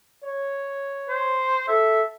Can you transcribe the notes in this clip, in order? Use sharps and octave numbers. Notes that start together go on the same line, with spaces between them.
C#5
C5
A4 E5